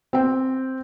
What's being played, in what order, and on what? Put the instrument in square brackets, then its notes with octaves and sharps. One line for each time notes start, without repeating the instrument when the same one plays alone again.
[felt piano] C4 G5